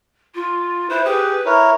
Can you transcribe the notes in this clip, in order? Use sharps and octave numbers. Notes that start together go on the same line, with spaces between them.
F4
E4 B4 C5
G4 G#4 B4
E4 A#4 C#5